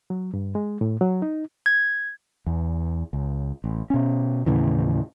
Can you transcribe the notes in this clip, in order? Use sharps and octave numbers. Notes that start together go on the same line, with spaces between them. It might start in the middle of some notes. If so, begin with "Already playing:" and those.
F#3
G2
G#3
A2
F#3
D#4
G#6
E2
C#2
A1
B2 C#4
D#2 A2 C#3 E3